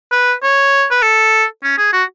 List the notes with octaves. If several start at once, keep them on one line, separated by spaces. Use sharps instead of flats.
B4
C#5
B4
A4
C#4
G#4
F#4